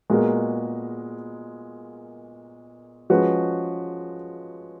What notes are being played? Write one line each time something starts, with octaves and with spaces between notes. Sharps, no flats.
A#2 G#3 B3 F#4 A#4
F3 G#3 C#4 F#4 B4